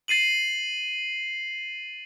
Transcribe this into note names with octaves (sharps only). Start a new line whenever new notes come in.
A6 C7 D#7 F#7